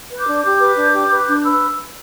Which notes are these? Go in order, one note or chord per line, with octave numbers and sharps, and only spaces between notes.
B4
D6 G6
D4
G4 D6 G6
B4
D4
G4
B4
D4
G6
B4 B5 E6